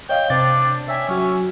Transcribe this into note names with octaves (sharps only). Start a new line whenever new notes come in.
C#5 D#5 F5 G5
C3 D4 C5 A6
C#5 E5 G5 G#5
F#3 C#4 F#4